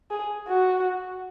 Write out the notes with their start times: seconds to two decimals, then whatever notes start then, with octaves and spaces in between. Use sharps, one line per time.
0.11 G#4
0.49 F#4